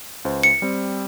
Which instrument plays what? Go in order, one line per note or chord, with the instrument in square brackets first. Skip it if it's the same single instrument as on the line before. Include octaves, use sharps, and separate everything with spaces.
[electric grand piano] C#2 C5
[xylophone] C#7
[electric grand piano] G3 C4